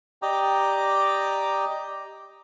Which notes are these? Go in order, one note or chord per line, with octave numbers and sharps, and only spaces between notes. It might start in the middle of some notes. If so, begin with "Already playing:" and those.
G4 D5 D#5 G5 A#5 D6